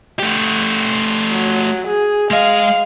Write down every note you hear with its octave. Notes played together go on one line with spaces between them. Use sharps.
A3 G4
F#3
G#4
G#3 D#5 F5